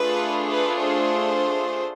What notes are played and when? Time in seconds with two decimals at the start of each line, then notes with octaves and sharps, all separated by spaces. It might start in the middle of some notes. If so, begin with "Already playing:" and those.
Already playing: A3 D4 F4 G#4 B4
0.51 B4
0.81 C5